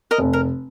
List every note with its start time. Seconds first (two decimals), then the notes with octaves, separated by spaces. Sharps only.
0.11 A#4 D#5
0.18 F1
0.33 A#4